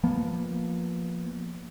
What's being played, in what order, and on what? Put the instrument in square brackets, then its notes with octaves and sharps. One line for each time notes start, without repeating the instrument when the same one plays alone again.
[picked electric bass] F3 A#3 B3